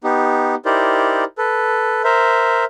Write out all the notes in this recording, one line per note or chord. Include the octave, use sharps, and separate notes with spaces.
B3 D#4 G4
D#4 E4 G4 A#4 C5 D5
A4 B4
A#4 C5 E5